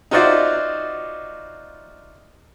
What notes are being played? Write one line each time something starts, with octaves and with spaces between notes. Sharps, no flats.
D#4 F4 F#4 C5 D5 E5